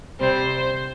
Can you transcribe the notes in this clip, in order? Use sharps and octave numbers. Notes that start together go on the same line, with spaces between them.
C3 G3 C4 C5